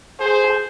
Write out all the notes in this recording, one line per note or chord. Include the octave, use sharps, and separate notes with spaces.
G#4 C5